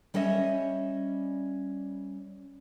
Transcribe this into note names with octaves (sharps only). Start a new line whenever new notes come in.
G3 C#4 C#5 D#5 E5